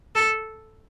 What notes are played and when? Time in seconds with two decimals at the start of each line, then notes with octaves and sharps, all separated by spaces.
0.15 A4